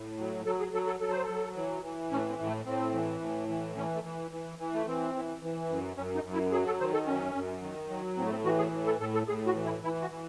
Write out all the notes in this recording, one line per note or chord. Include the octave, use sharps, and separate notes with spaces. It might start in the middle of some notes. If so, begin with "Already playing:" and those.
Already playing: A2
F#3
F#3 A4
G#4
F#3 A4
A4
F#3 A4
C5
A4
F#3
E3
E3
A2 C#4
C4
A2
A3
A2 C4
E3
A2
E3
E3 C#4
A3
E3
E3
E3
A3
E3 C4
E3
E3
F#2
F#2 C#4
D#4
F#2
E4
F#3 G#4
A4
D#3 C5
A4
F#2 C#4
F#2
D#3
F#3
A2 C4
A3
C4
E3 F#4
G#4
A2
A4
A2 A4
A4
A2 G#4
F#4
E3
E4
E3 E4
F#4
E3